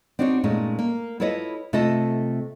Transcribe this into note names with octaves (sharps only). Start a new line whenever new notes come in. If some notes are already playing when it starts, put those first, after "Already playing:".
C4 D4 D#4 F#4 C#5
A#2 G#3 A3 C#4 D#4
A#3
E4 F4 A4 B4 C#5 D#5
C3 A3 F4 A4 D#5 A5